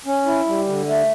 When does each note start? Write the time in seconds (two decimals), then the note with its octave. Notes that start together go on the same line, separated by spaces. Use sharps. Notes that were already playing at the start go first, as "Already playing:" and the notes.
0.06 C#4
0.26 E4
0.47 G3
0.68 D3
0.88 A3